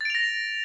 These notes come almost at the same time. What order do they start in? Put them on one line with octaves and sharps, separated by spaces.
A6 D7 F7 A#6